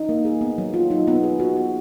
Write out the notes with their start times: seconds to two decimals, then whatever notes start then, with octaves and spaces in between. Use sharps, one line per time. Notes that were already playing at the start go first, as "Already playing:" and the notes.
Already playing: D#4
0.09 A#3
0.25 G#4
0.41 B3
0.58 F#3
0.74 F4
0.91 D#4
1.07 B3
1.23 G#4
1.40 F#4
1.57 B3